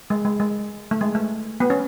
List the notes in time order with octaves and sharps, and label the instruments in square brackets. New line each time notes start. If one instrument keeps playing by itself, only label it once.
[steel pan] G#3
G#3
G#3
A3
G#3
A3
B3
C#4